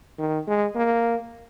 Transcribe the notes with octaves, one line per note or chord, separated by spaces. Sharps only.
D#3
G#3
A#3